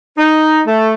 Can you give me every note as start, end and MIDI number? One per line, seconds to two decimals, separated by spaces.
0.18 0.60 63
0.67 0.93 57